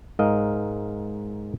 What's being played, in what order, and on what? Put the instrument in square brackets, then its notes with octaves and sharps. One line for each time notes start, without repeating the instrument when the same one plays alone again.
[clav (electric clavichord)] G#2 A#4 D#5 F5